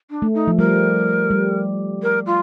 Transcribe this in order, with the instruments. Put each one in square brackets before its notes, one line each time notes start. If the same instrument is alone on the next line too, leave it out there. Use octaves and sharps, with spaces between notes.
[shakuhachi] D4
[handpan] A3
[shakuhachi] D#4
[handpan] F3
[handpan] G3 [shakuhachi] A#4
[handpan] G3
[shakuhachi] A#4
F4